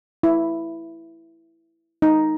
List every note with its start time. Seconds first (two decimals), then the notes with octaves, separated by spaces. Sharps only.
0.23 E4
2.02 D#4